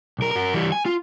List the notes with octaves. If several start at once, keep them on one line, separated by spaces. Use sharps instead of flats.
B1 A#4
F#4 A#4
E3 G3
G#5
F4